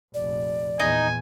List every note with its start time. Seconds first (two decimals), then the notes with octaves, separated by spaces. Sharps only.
0.14 F1 A#1 D5
0.80 E2 A#2 D#4 G#5